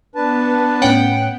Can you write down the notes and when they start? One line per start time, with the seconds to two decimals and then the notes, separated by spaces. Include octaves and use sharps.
0.16 B3 D4 B4 A5
0.82 A2 C#4 F#5 G5